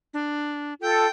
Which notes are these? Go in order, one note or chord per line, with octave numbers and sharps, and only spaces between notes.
D4
F4 A4 G5